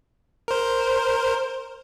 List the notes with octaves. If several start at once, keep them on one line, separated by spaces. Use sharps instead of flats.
A#4 C5